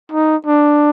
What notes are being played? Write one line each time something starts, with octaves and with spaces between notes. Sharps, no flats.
D#4
D4